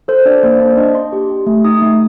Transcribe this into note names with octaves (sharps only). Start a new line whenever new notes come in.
A4 C5
D4 D5
A#3 C5
C5
D4 D5
D4 D#5
D4 C6
G4
G4
A3
D#4 D#6
A3